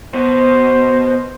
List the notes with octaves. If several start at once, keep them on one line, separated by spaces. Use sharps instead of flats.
B2 C5